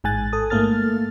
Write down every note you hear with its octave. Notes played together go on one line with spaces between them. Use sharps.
A1 G#2 G#3 G#5 F#6 A6
A4 D#6
G#2 A3 A#3 A4 F6 A6